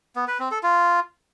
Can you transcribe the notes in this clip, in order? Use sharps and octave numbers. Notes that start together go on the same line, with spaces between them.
B3
B4
C4
A4
F4